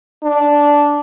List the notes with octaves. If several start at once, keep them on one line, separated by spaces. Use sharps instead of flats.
D4